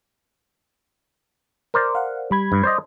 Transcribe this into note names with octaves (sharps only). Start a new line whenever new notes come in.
A#4 C5 D5
F5 F#5
G3 B5 G#6
G2
C5 D5 D#5